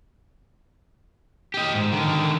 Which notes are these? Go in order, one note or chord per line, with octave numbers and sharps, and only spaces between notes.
G4 D#5
G#2
D3 D#3